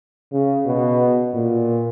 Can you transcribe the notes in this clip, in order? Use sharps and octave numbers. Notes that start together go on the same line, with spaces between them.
C#3
B2
A#2